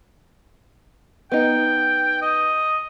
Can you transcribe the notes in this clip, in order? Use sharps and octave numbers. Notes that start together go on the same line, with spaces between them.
B3 D#4 G5
D#5